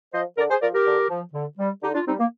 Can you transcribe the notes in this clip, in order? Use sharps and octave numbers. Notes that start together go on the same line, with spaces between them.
F3 C5 D#5
D3 A#4 D5
G#4 C5
F3 A#4 D5
G4 A#4
D3
F3
D3
G3
D3 D#4 G4
D4 F4
G3 C4 D#4
A#3